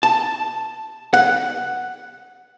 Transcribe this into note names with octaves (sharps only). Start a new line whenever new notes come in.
A5
F#5